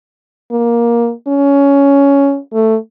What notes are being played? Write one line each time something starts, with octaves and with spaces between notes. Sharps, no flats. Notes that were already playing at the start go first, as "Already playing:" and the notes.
A#3
C#4
A3